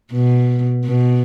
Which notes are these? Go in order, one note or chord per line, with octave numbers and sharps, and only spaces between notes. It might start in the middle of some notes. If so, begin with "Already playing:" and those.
B2
B2